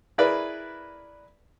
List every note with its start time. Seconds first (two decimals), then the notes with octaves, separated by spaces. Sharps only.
0.18 E4 G#4 A#4 B4 D5